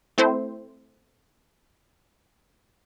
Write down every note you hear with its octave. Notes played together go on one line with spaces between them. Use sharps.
A3 C4 E4 C5